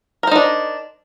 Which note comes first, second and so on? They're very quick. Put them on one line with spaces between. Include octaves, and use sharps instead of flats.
A#4 C5 D#4 D4